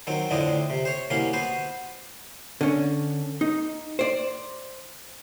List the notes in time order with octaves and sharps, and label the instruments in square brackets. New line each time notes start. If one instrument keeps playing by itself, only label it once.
[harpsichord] D#3 F#3 C4
F2 A2 D3 C4 D4 D#5
C3
C5 C#5
C2 A#3 C#4 F#4 C6
B3 F#4 C5
[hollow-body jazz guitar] D3 C#4
D#4
C5 D5